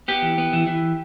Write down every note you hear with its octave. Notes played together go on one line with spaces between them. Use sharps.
B3 G4
E3
B3
E3
E3